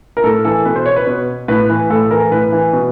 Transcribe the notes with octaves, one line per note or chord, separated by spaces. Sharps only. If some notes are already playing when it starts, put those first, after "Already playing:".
A#4
A2 A4
E3 A4
B2 B4
C5
C#5
B4
B2
A2 B4
E3 B4
A2 A4
E3 A#4
A2 B4
E3
B2